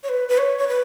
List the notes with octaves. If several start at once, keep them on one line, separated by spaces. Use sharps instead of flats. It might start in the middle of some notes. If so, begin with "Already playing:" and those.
C#5
B4
B4
C#5
C#5
B4